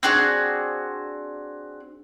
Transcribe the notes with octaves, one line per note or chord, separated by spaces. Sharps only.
C4 D4 F#4 G#4